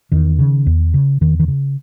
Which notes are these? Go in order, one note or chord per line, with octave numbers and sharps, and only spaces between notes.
E2 D#3
C#3
E2
C#3
E2 D#3
D#3
C#3